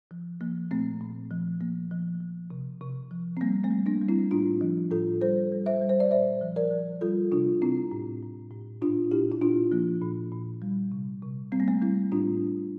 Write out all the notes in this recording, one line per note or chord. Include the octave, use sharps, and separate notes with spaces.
F3
F3 A#3
A#2 A3 C4
A#2
F3
F3 A#3
F3
F3
C3
C3
F3
C4
G3 A#3
A3 C4
G3
A#3 D4
G3
C4 E4
A2 D4 F4
F3
A2 F4 A4
G3 A4 C5
G3
C5 E5
G3
C5
D5
A#2 C5 E5
F3
A#4 D5
F3
G3 F4 A4
C3 D4 F4
C3 C4 E4
A2
A2
A2
A#2 D4 F4
A#2 E4 G4
E4
A#2 D4 F4
F3 A#3
A#2
A#2
G3
C3
C3
G3 C4
A#3
A3 C4
G3 C4 E4
A2 D4 F4